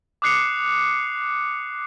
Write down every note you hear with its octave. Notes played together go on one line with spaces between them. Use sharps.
D6 D#6 F#6 C7 C#7 F7